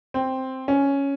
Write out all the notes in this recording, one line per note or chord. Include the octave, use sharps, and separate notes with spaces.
C4
C#4